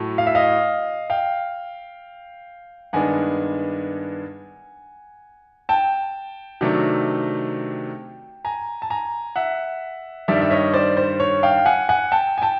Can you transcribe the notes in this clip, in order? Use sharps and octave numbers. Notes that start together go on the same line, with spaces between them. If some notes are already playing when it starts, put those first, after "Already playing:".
Already playing: A2 F#3 A3
F5
E5
D#5 F5
F5 G5
G2 D#3 G#3 B3 D4 F#5 G#5
G5 A5
C3 D#3 F#3 A3 D4
G#5 A#5
A5
G#5 A#5
E5 F#5
G2 D#3 G3 D5 E5
E5
C#5 D#5
C5 D5
C5
C#5
F5 G5
F#5 G#5
F#5 G#5
G5 A5
G#5
G5 A5